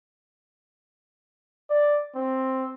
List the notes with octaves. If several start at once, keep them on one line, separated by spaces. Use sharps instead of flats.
D5
C4